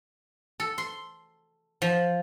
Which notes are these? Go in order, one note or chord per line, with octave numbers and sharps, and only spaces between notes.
A4
C6
F3